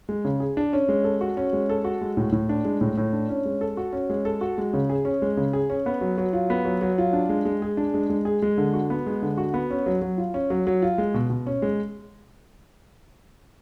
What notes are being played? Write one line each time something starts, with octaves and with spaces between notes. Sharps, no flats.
G#3
C#3
G#4
D4
C#4
G#3
A4
F#4
C#4
G#3
A4
F#4
G#3
A2
A2
D4
G#3
A2
A2
D4
C#4
G#3
A4
F#4
C#4
G#3
A4
F#4
G#3
C#3
G#4
C#4
G#3
C#3
G#4
C#4
B3
F#3
F#3
F4
B3
F#3
F#3
F4
D4
G#3
G#3
G#4
D4
G#3
G#3
G#4
G#3
D3
F#4
B3
G#3
D3
F#4
B3
C#4
F#3
F#3
F4
C#4
F#3
F#3
F4
G#3
B2
B2
C#4
G#3